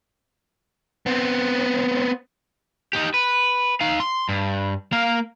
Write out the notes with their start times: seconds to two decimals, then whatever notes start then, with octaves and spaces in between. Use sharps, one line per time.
1.06 B3 C4
2.93 D#4 G4
3.14 B4
3.81 D#4 F5
4.00 C6
4.29 G2
4.92 A#3 F5